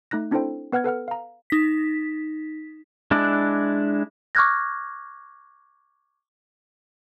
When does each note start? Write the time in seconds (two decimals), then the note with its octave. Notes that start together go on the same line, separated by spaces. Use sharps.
0.11 A3 D#4 F#6 A#6
0.31 C4 D4 E4 A4 C5 G5
0.72 B3 B4 F#5 F6 G#6
0.84 A4 B4 F#5 F6
1.08 F5 A#5
1.50 D#4 B6
3.11 G#3 D4 E4 D5 F#6
4.35 C#6 D6 F6 F#6 G#6 A#6